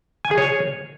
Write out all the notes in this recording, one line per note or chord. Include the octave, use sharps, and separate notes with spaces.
G#5
G#4
C#5